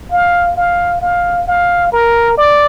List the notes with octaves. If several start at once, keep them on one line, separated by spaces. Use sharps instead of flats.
F5
F5
F5
F5
A#4
D5